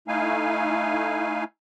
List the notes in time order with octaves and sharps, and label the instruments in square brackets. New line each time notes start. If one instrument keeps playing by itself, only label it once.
[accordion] A3 D#4 E4 F5 G#5